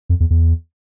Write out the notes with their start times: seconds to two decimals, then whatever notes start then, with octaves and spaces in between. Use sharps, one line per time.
0.09 F2
0.20 E2
0.30 E2